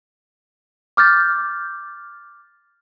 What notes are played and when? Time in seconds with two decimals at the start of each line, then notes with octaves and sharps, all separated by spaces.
0.97 D6 F6 G6 A6